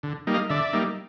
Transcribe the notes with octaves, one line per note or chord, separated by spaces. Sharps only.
D3
G3 A#3 D#4
D#5 F5
D3 D5 E5
G3 A#3 D#4